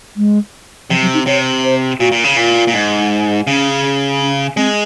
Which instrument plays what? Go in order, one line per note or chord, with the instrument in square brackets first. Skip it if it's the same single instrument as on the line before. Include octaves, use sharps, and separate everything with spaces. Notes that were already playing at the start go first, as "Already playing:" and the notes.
[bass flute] G#3
[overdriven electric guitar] C3 [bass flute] F3
[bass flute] F#3
D#4
[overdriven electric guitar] C3 [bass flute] C#5
[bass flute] C5
[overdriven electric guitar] A#2 [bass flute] F#4
[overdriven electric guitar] A#2
C#3
[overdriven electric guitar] A#2 [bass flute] F4
[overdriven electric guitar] A#2
G#2
[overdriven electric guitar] C#3 [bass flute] C#4
[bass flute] C#4
[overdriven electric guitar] G#3 [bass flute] C4